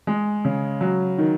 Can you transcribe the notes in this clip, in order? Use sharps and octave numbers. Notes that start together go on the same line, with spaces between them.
G#3
C#3
F#3
D#3